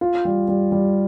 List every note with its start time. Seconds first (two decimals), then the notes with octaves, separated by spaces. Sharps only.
0.01 F4
0.25 G3
0.48 G3
0.72 G3